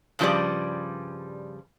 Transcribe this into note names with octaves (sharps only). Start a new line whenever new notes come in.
G2 C#3 F3 G3 G#4 D5